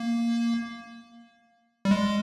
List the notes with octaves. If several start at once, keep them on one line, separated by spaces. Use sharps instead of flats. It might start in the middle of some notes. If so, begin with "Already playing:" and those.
Already playing: A#3
G3
G#3